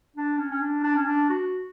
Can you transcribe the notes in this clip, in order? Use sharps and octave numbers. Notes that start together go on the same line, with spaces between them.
D4
C#4
C#4
D4
D4
C#4
D4
F#4